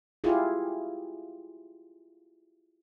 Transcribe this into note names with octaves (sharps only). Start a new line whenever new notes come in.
E4 F4 G4 G#4